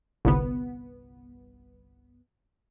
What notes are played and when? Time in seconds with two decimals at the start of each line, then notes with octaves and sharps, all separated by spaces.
0.25 G1 C2 B3